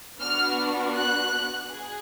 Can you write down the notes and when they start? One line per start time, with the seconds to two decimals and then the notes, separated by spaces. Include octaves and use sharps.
0.20 B3 D4 F#4 F6
0.96 F#6
1.71 G#4